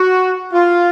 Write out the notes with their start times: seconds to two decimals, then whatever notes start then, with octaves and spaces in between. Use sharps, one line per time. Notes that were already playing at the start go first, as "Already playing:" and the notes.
Already playing: F#4
0.52 F4